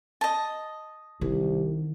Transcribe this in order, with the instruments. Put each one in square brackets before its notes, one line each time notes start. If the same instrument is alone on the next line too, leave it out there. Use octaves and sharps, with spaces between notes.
[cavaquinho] D#5 A5
[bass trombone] C2 [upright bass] D#3